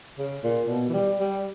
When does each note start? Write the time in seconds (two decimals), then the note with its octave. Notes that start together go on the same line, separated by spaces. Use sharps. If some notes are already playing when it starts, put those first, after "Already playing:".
0.19 C#3
0.44 A#2
0.69 B2
0.89 E3
0.94 G3
1.19 G3